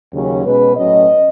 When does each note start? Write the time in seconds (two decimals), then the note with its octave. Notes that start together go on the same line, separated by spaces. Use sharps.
0.13 D#2 C#3 F#3 C#4
0.45 B2 G#3 C#4 B4
0.76 A2 F#3 C#4 D#5